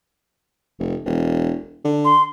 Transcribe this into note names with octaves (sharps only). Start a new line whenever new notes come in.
F1
E1
D3
C6